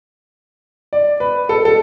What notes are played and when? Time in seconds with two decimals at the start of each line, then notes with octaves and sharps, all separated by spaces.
0.93 D5
1.20 B4
1.49 A4
1.65 A4